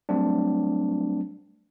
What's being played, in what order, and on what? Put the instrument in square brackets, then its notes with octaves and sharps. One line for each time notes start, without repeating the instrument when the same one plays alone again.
[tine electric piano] F#3 G3 A3 C4 D4